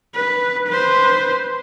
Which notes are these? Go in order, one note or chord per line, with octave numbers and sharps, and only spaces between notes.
B4
B4 C5